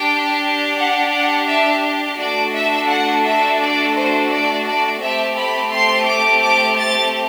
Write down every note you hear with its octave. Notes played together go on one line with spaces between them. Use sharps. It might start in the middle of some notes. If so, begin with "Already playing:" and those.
Already playing: D4 G4 G5
F#5
F#5
E5
A3 D4 F#4 A4 D5
E5
F#5
E5
D5
C5
D5
D5
A3 C4 G4 E5
B5
C6
D6
D6
A6